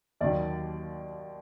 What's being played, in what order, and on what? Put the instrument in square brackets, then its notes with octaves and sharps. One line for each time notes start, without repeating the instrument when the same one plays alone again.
[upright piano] D#2 D#3 F#3 D5